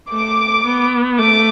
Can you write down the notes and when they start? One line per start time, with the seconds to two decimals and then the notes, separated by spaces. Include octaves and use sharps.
0.11 A3 D6
0.65 B3
1.19 A3 D6